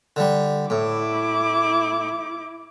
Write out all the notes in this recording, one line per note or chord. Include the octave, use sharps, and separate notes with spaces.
D3 G3
A2 E4 D6